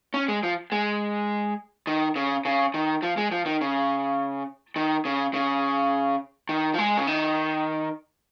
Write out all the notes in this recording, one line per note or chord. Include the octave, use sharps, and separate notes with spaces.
C#4
G#3
F3
G#3
D#3
C#3
C#3
D#3
F3
G#3
F3
D#3
C#3
D#3
C#3
C#3
D#3
F3
G#3
C#3
D#3